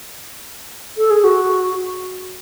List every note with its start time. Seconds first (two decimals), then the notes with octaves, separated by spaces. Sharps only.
0.97 A4
1.10 G#4
1.24 F#4